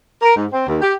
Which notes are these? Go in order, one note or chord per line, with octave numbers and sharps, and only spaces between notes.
A#4
G#2
C4
D#2
G4